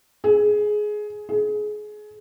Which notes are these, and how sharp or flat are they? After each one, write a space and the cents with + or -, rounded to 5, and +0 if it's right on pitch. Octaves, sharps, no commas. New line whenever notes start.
G#4 +15
G#4 +25